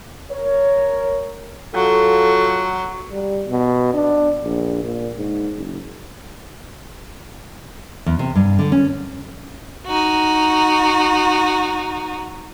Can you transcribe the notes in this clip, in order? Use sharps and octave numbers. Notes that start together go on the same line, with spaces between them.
A#4 C#5
F#3 F4 A4
G3
B2
D4
A#1
A#2
G#2
F#1
E2
C3
G2
D3
C#4
D#4 F#4